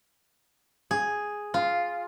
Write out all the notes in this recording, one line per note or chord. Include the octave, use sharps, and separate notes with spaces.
G#4
F4